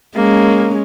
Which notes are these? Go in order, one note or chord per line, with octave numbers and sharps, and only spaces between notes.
G#3 A#3 C#4